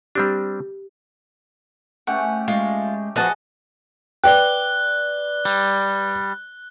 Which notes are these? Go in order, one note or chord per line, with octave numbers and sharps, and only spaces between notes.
G3 C4 D4 G4
A3 C#4 G4 F#5
G#3 F4
F3 B3 F#4 G#4 D#5 F#5 A5
B4 D5 G5 F#6 G7
G3